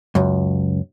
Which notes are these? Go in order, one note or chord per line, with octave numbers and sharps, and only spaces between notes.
C#2 F#2